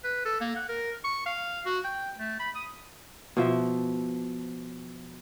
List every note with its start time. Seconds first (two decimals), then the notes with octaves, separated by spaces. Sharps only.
0.04 B4
0.25 A4
0.41 A#3
0.56 F#5
0.69 A#4
1.04 C#6
1.26 F5
1.65 F#4
1.84 G5
2.18 A3
2.39 B5
2.55 D#6
3.37 B2 F3 E5